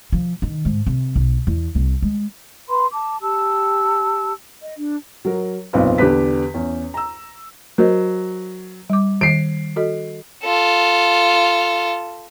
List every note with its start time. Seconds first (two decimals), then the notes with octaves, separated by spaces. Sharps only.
0.12 F3
0.42 D#3
0.65 G#2
0.87 C3
1.16 B1
1.47 E2
1.75 C2
2.02 G#3
2.69 B4 B5 C6
2.91 A5 D6
3.22 G4 A5 E6
4.62 D#5
4.77 D4
5.25 F#3 A#4
5.73 F#1 B1 A#2 C4 B4 F5
5.98 E2 D3 G4 B4 B6
6.54 E2 C#4
6.94 A#5 E6
7.78 F#3 A#4 C5 D#5
8.90 G3 D6
9.21 D#3 C7 D7
9.76 F#4 A4 D#5
10.44 F4 A4